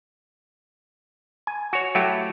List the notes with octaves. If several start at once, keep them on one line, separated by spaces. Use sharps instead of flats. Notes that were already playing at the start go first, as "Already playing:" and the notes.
G#5
F#4 C#5
F#3 A3 E4 F#4 G4